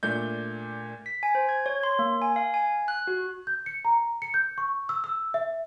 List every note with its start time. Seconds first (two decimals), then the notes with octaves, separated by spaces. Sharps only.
0.03 A#2 A3 D4 G6
1.06 B6
1.23 G#5
1.35 C5
1.49 G#6
1.66 C#5
1.83 C6
1.99 A#3
2.22 G#5
2.36 F5
2.54 G#5
2.88 F#6
3.07 F#4
3.47 G6
3.66 C#7
3.85 A#5
4.22 C#7
4.34 G6
4.58 C#6
4.89 E6
5.04 E6
5.34 E5